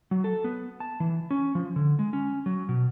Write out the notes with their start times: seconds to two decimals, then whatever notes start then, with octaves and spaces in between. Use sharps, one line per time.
0.11 F#3
0.24 A4
0.44 B3
0.80 A5
1.00 E3
1.31 C#4
1.55 F3
1.76 D3
1.99 G#3
2.13 C#4
2.46 F#3
2.69 B2